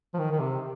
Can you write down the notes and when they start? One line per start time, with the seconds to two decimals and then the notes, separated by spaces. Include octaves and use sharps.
0.14 F3
0.18 D#3
0.31 D#3
0.40 C3